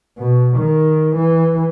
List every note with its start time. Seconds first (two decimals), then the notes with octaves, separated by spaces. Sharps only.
0.18 B2
0.57 D#3
1.16 E3